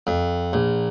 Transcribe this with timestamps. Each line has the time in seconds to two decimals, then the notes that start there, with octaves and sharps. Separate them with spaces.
0.07 F2
0.53 A#1